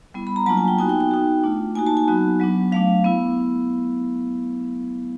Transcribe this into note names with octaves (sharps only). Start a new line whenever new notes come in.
G3 B3 E4
B5
A#5
F#3 A#3 D4 F4 A5
G#5
G5
B3 D#4 F#4 G#5
G5
G5
B3 D#4 F#4
A3 D4 F4
A#3 D#4 F#4 G#5
A5
G#5
F#3 B3 D#4 F#4
F#3 B3 D4
F#3 A3 D4 F5
B3 E4